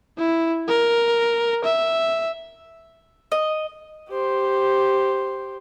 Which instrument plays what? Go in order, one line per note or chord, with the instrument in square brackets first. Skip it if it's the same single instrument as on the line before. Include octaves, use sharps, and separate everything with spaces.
[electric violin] E4
A#4
E5
[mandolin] D#5
[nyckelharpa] G4 C5